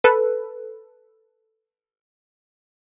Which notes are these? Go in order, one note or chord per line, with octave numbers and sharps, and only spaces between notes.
A4 B4